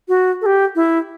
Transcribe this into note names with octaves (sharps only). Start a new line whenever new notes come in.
F#4
A4
G4
E4